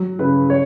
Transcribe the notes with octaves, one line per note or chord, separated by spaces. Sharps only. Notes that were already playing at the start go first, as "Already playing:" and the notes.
Already playing: F#3
C#3 B4
C#5